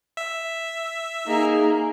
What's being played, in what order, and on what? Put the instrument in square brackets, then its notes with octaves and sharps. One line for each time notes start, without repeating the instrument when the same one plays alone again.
[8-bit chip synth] E5
[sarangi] A#3 [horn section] D#4 G#4